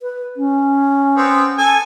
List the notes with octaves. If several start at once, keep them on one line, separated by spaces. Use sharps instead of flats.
B4
C#4
B3 C4
A4 G#5